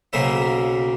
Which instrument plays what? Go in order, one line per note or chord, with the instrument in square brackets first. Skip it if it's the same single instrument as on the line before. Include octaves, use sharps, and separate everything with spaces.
[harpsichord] B1 C#3 A#3 C5 E5